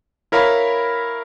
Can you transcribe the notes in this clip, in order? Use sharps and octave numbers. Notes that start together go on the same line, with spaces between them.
E4 A#4 C#5 F5 B5